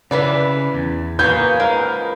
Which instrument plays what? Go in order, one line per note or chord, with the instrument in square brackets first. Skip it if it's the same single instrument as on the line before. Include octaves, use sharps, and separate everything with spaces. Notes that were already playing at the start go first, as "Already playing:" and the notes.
[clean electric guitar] C#3 E5 [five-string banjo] E3 B4 D5
[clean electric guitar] E2
[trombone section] A#3 [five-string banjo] F#4 B4 [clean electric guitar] G#4 C#5 [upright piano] G6
[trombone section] C#2 G#2 B4 [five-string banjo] G#3 [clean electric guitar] A#4